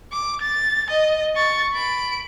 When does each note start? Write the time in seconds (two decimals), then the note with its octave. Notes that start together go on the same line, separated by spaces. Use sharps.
0.12 D6
0.41 A6
0.90 D#5
1.36 C#6 A6
1.73 B5 D7